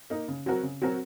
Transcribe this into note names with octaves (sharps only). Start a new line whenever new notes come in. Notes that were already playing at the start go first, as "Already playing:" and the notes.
A#3 D#4
C#3
F#3 C4 F#4 A#4
C#3
F#3 C4 F#4 A#4